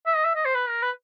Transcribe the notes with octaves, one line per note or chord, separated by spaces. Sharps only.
E5
D#5
E5
D#5
C5
B4
A#4
B4